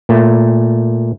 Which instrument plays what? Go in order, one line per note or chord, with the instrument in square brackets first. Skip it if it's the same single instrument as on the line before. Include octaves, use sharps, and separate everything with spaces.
[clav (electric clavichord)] A#2 A3